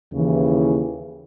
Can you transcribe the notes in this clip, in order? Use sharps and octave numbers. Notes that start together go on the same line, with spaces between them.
D#2 C#3 E3